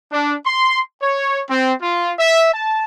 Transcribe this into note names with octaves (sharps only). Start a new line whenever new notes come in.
D4
C6
C#5
C4
F4
E5
A5